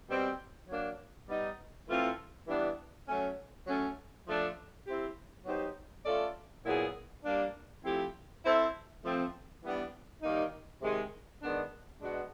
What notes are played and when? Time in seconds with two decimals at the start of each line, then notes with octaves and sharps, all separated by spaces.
0.09 B2 G3 C4
0.69 F#3 A#3 D4
1.29 G3 B3 D#4
1.88 E3 A3 C4 F4 A4
2.48 E3 G3 B3 D4
3.08 F#3 A3 C#4
3.67 F#3 A3 C#4
4.27 F3 A3 D4
4.86 C4 E4 G4
5.45 F#3 B3 D#4 G4 C5
6.05 A3 C#4 F4 A4 D5
6.65 A#2 F#3 B3 E4 G#4
7.24 G3 A#3 D4
7.85 F3 A3 C4 E4 G4
8.44 C4 E4 A4 C5 E5
9.04 F3 A3 C4
9.63 E3 G3 B3 D4
10.22 D#3 G3 A#3 D#4
10.82 C3 D#3 G#3
11.42 D#3 G#3 B3 D4
12.01 B2 G#3 B3 D4 F#4